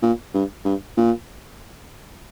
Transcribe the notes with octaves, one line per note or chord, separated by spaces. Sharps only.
A#2
G2
G2
A#2